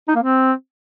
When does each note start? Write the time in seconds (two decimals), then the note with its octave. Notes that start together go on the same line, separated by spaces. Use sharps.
0.08 D#4
0.15 A#3
0.22 C4